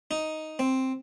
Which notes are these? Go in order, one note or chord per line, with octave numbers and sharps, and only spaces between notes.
D#4
C4